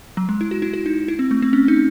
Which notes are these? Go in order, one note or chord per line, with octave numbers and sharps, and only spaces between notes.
F#3
G#3
E4
F#4
E4
F#4
D#4
E4
C4
A3
C4
C#4
D#4